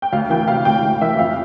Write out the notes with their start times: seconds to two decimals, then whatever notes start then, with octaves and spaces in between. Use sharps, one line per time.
0.02 G5
0.13 D2 F5
0.30 E3 G5
0.47 C3 F5
0.65 D2 G5
0.83 D2
1.01 E3 E5
1.19 F2 F5